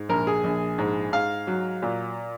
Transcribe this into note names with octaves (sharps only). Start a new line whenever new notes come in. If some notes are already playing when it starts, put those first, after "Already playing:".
Already playing: G#2
A#1 A#4
G#4
A#1
G#2
G#2 F5
F#3
A#2